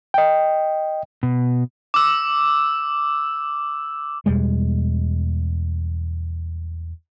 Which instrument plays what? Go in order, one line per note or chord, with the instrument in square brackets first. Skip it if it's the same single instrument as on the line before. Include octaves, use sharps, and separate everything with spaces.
[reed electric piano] D#5 G5
[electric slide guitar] B2
[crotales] D6 E6
[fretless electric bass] E2 B2 G3 G#3